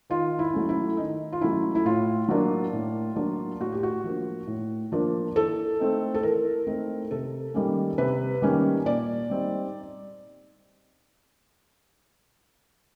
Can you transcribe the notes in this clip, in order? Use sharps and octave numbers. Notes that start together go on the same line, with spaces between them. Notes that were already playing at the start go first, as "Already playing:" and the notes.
D#3 F4
E4
F#3 A3 C#4
E4
D#3 D#4
F4
F#3 A3 C#4 E4
E4
A2 F4
F#3 A#3 D4
A2
F#3 A#3 D4
A2 F#4
G4
F#4
F3 A#3 D4
A2
F3 A#3 D4
E3 A4
A3 C4 D#4
A4
E3 A#4
A3 C4 D#4
C3 A4
D#3 G3 A#3 C#4
C3 B4
D#3 G3 A#3 C#4
A#2 D5
G3 C4 D#4